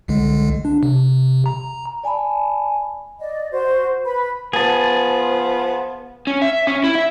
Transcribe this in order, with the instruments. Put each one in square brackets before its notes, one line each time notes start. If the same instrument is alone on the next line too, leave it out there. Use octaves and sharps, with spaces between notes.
[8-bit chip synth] C2 D3 G#3
D4
C3
A#5
[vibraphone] D5 G#5 A5 B5
[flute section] D5 D#5
F#4 C5
B4 B5
[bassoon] F3 [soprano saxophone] B3 [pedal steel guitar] G#4 A5
[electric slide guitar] C#4
E5
C#4
E4
E5